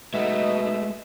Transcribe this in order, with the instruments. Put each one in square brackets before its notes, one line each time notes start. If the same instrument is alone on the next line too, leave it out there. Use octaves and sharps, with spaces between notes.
[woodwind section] B2 [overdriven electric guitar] G#3 A3 [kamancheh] D#4 D#5 [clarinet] E5